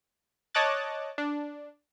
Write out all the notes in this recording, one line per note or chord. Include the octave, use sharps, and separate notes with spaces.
C#5 D#5 A5 D6 F#6 A6
D4